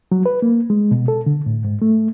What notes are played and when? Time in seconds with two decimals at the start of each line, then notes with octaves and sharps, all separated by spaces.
0.12 F#3
0.26 B4
0.42 A#3
0.70 G#3
0.91 B2
1.08 A4
1.26 D3
1.46 A2
1.65 G#2
1.82 A3